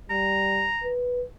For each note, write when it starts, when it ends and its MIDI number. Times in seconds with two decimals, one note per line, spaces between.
0.10 0.70 55
0.10 0.89 82
0.84 1.23 71